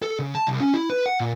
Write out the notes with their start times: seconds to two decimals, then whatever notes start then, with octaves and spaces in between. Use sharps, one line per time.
0.02 A4
0.19 C#3
0.35 A5
0.47 C2
0.61 C#4
0.74 E4
0.90 B4
1.06 F#5
1.20 A#2